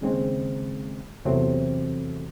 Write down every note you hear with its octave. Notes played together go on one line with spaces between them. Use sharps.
D#2 C#3 G#3 C4
E2 C3 F#3 A3 C4